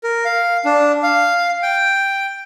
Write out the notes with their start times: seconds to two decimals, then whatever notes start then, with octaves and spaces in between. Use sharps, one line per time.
0.04 A#4
0.25 F5
0.65 D4
1.03 F5
1.62 G5